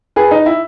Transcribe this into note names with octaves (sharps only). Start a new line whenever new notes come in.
G#4 B4
D#4
E4